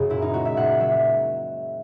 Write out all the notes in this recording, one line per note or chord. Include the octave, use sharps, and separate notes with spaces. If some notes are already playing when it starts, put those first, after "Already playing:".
Already playing: F#2 C#3 G#4
A#2 E4
D#4
G#3 F#4
E5
A#2 F#5
F#3 E5